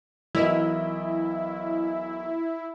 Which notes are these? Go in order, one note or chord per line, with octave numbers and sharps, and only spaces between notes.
B1 E3 E4 A#4 D#5